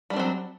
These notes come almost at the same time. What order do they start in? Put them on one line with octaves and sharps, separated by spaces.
G3 D4 C4 F#3